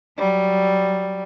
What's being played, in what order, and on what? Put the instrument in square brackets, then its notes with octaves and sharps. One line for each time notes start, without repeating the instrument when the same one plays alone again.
[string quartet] F#3 G3